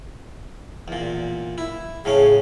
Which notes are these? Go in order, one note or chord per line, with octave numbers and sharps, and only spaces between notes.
E2 A#2
E4
A2 C#3 C#4 G#4